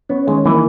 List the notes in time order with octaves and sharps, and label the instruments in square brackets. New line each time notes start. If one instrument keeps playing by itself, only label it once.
[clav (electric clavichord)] B3 [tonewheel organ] C#4
[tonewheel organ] D#3 [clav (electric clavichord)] G#3
[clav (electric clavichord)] E3 [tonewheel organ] A#3